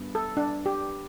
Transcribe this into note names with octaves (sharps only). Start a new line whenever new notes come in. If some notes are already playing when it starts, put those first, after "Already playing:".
Already playing: G2 B3
A4
D4
G4